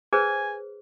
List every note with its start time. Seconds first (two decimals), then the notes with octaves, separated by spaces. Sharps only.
0.13 G#4 B4 C5 G#5